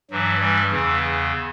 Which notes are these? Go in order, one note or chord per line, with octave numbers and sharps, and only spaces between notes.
G2 E3 F#3
E3 G3
E2 C#3 E3